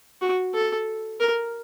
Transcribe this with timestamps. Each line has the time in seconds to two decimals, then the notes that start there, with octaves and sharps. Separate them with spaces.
0.22 F#4
0.54 A4
1.20 A#4